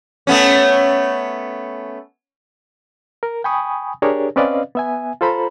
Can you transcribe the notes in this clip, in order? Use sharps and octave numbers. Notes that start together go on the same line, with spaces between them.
A3 B3 C#4
A#4
G5 G#5 B5 C#6 D#6
D4 G4 G#4 A#4 C#5 D5
C4 C#4 B4 D5 D#5 F5
B3 E5 G#5
F4 A4 C5 A#5 B5